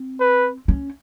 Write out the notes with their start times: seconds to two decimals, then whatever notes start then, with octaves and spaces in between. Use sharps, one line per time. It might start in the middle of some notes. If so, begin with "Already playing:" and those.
Already playing: C4
0.20 B4
0.68 C#4